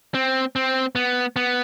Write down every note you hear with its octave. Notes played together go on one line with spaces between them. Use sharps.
C4
C4
B3
B3